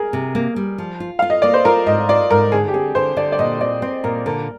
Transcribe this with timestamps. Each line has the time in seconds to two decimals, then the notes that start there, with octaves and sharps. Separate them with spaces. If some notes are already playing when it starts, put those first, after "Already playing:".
Already playing: G#4 A#4
0.13 C3
0.35 A#3
0.56 G3
0.78 F3
1.00 F4
1.19 F4 F5
1.30 D#5
1.42 A#3 D5
1.54 C5
1.65 F4 A#4
1.86 G#2 D#5
2.09 F4 D5
2.30 G#2 A#4
2.52 D3 G#4
2.68 G4
2.74 C4 G#4
2.95 D3 C5
3.17 D3 D5
3.32 D5
3.39 A#2 D#5
3.61 C4 D5
3.82 C4 C5
4.04 A#2 A#4
4.26 D3 A#4